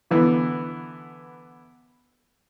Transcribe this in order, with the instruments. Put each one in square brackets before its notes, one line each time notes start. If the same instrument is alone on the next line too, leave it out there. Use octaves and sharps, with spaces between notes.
[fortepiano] D3 E3 B3